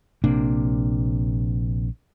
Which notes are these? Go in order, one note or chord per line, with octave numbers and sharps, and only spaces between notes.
A#1 C3 A#3 D4